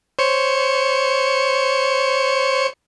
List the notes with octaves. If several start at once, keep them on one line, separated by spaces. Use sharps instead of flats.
C5 C#5 C#7